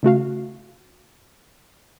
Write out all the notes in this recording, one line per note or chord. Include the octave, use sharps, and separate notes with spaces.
C#3 A3 F#4 F5